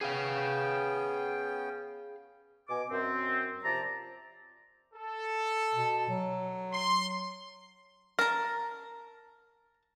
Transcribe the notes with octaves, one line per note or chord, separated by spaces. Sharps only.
B3 C#4 G#4 F5 G5
B2 G#5 D6
F#2 C4
C3 F3 D5 A5 A#5
A4
B2
F#3
C6
A#4 A5 A#5